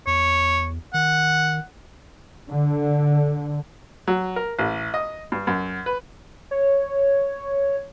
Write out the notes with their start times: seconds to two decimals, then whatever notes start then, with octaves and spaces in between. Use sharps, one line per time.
0.07 E2 C#5
0.94 D#3 F#5
2.50 D3
4.07 F#3
4.36 A#4
4.59 A1
4.94 D#5
5.32 G2
5.47 F#2
5.86 B4
6.51 C#5